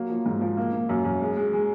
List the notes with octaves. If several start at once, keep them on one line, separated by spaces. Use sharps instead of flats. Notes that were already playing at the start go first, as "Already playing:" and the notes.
Already playing: F#3 A#3
F3
G#2
F3
A#3
A#3
F#2
F#2
G#3
G#3
G#3